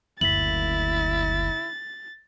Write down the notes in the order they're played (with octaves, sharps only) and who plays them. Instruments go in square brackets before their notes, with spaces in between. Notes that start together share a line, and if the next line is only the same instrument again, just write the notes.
[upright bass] F#1 D2 [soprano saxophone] E4 [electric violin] A6 [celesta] B6 F#7